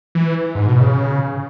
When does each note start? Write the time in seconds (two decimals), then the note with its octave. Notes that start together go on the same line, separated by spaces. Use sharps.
0.15 E3
0.55 G#2
0.68 B2
0.80 C#3